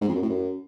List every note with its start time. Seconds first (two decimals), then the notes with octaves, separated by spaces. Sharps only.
0.01 G#2
0.08 F2
0.15 F#2
0.22 A2
0.29 F#2